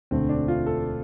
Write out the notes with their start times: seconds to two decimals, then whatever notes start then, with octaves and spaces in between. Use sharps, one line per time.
0.11 E1 D2 D3 A3 C4
0.29 D4
0.48 F4
0.66 A4